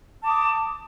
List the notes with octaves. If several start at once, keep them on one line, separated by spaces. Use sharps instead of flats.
A5 D6 D#6